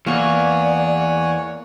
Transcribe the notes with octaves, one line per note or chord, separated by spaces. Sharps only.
E2 A#3 C#5 D5 F#5 G#5 C#6